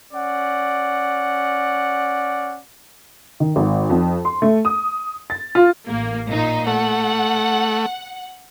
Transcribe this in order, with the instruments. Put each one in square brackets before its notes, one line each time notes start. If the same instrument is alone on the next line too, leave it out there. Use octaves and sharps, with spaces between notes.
[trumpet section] C#4 D5 F#5
[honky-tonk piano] D#3
G#1
F2
C6
A3
D#6
A6
F4
[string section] A1 A#3
A#2 D#4
[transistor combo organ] A3 [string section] F#5